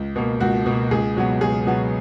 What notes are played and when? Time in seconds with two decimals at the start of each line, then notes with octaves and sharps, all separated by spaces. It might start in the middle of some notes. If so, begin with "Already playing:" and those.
Already playing: C#2
0.16 B2 A#3
0.40 C#2 F#4
0.66 B2
0.71 A#3
0.91 C#2 G#4
1.16 B2 F#3 B3
1.41 C#2 G#4
1.66 B2 F#3 B3